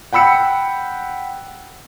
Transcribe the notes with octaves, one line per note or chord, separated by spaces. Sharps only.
F#5 G5 B5 E6 C#7